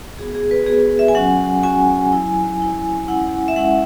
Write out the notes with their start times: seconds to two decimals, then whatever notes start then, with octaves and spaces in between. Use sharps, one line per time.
0.18 B3 F#4 G#4
0.35 G#4
0.51 B4
0.67 B3 F#4 G#4
0.99 E5
1.08 G#5
1.15 F#3 C#4 F#4 F#5
1.63 F#3 C#4 F#4 G#5
2.12 F#3 E4
2.60 F#3 E4
3.08 G#3 C#4 E4 F#5
3.48 E5
3.56 G#3 C#4 E4 F#5